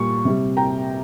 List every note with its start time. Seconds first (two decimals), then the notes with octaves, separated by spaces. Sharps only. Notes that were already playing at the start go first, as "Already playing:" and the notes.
Already playing: A#2 G3 C#6
0.25 C3 G3
0.57 G5 A#5